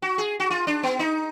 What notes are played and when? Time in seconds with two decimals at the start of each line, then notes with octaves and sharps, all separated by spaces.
0.02 F#4
0.18 G#4
0.40 F#4
0.50 F4
0.67 D4
0.83 B3
0.99 D#4